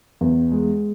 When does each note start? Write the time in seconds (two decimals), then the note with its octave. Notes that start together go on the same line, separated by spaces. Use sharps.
0.21 E2
0.51 G#3